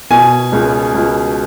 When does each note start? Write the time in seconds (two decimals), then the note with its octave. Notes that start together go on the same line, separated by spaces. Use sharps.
0.11 B2 G#5
0.52 C#2
0.94 C#2